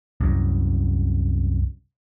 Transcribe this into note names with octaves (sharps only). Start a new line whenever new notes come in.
C2 F#2